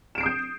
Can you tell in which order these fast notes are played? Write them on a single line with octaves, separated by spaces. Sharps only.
E7 D7 C7 D#6 G6